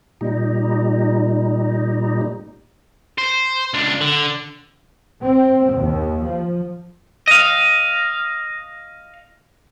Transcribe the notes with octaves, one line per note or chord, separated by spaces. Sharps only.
A#2 G3 D#4
C5
C#2 D4
D3
C4
D#2
F3
D#5 F5